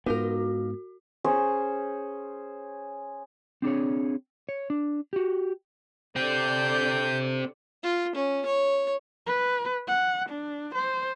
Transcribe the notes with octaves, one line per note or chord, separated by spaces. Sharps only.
G#2 B3 D#4 F4 F#4 A#4
C#4 G#4 C5 C#6
C4 D4 G#4 C#5
C#5
D4
F#4 G4
D3 C4 G4 D5 G6
F4
C#4
C#5
B4
F#5
D4
C5